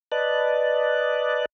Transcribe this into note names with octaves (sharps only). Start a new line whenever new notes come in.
B4 D5 D#5 A5 F#6